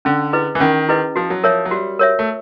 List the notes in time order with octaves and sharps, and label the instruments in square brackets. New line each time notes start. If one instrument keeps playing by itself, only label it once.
[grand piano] D3 [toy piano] C#4
[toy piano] E4 G#4 B4 D#5
[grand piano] E3
[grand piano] D#3 [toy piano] C#4
[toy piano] E4 G#4 B4 D#5
[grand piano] F3 [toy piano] F#4
[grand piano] F#3
[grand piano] F3 [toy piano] A#4 C#5 E5
[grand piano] F#3
[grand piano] G3 [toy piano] F#4
[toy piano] A#4 C#5 E5
[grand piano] A3